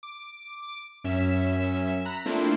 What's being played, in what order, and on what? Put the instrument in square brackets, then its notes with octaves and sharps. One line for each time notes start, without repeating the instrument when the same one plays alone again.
[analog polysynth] D6
F#2 C#4 E5 E7
A#5 B5 F#6
A3 A#3 C4 D4 E4 F4